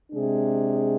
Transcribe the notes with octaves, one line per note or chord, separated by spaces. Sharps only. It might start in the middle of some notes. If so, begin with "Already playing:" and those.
C3 G#3 D4 G#4